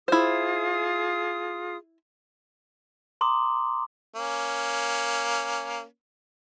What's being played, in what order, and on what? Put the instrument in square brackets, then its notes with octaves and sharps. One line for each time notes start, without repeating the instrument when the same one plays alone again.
[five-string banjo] E4 C5 [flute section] F4 G#4 D#6
[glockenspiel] A#5 C6 D6 D#6
[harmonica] A#3 C#4